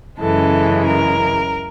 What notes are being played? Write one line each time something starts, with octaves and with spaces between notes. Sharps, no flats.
F#2 C#3 E3 G#3 A4
A#4